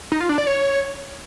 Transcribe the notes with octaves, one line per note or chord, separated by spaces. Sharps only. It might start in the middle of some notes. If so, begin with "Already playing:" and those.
D#4
F4
D4
D5
C#5